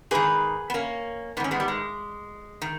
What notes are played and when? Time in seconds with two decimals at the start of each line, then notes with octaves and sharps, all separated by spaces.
0.11 G#2 D#3 G#4 B4
0.70 B3
0.74 A#3 C#4
1.37 G#2 B3
1.40 D#3 C#4
1.51 G#3 B3
1.60 G3
1.68 G#3
2.62 D#3